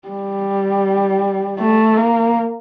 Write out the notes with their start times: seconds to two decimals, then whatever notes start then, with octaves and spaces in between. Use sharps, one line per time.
0.08 G3
1.59 A3
1.97 A#3